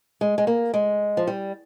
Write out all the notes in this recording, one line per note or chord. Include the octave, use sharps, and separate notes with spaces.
G#3
G#3
A#3
G#3
F3
G3